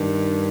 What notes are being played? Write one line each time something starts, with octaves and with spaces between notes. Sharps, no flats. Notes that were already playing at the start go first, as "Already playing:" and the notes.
Already playing: G2 D#3